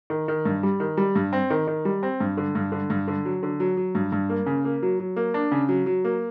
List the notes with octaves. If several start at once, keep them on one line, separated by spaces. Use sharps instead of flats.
D#3
D#3
G2
G3
D#3
G3
G2
C4
D#3
D#3
G3
C4
G2
D3
G2
D3
G2
D3
F#3
D3
F#3
F#3
G2
G2
A#3
C#3
A#3
F#3
F#3
A#3
D4
C#3
F#3
F#3
A#3